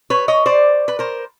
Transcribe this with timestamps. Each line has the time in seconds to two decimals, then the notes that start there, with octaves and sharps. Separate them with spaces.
0.10 B4 C#5
0.28 C#5 D#5
0.46 C5 D5
0.88 B4
0.99 A#4 C5